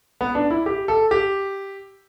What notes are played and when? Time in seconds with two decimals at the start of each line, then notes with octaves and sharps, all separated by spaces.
0.21 B3
0.35 D4
0.51 E4
0.66 G4
0.88 A4
1.11 G4